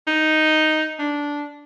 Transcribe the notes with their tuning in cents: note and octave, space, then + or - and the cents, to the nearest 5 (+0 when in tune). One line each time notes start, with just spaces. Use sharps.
D#4 +0
D4 -10